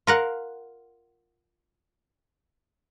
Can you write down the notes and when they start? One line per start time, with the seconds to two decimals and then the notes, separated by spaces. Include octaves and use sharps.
0.07 F4 A#4 F#5